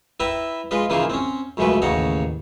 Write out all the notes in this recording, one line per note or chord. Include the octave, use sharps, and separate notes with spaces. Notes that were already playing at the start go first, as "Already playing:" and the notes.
E4 B4 E5 G5 A#5
G#3 F4 B4 D#5
C#3 E3 A#3 D#4 F4 G#4
C4 C#4
C#2 F#2 C#3 G#3 A3 B4
A1 D#2 C#3 D#4 F#5 A#5